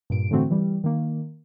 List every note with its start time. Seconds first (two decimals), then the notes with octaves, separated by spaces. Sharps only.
0.10 G2 A#2 D7
0.30 A2 D3 E3 A3 C4 F#4
0.50 E3 G3
0.84 D#3 A#3